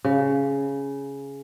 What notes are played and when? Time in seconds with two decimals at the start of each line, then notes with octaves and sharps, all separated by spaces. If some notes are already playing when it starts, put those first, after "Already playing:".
0.04 C#3